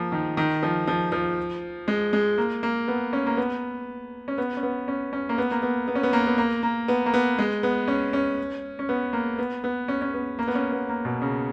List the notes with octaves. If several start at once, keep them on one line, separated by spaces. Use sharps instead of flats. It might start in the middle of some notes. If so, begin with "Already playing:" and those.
Already playing: F3 A#3
D#3
D#3
F3
F3
F3
G#3
G#3
A#3
A#3
B3
C#4
A#3
B3
C#4
B3
C#4
B3
C#4
C#4
A#3
B3
A#3
B3
B3
C#4
B3
A#3
B3
A#3
A#3
B3
A#3
B3
G#3
B3
C#4
C#4
C#4
B3
A#3
B3
B3
C#4
C#4
B3
A#3
B3
C#4
B3
A#3
B2
C#3